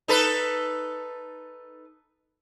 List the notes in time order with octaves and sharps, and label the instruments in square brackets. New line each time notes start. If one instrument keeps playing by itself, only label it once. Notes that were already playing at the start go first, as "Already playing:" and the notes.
[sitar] D#4 A4 B4